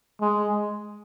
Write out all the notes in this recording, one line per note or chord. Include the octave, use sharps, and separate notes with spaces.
G#3